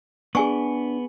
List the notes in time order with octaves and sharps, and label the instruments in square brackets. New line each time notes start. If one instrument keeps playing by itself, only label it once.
[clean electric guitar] B3 [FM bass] D4 [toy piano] G#4 G#5 C#6